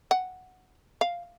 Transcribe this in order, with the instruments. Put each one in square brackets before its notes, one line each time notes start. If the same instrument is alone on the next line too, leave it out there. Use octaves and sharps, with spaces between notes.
[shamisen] F#5
F5